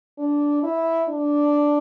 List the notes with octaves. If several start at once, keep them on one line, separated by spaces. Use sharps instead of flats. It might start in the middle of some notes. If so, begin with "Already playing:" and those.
D4
E4
D4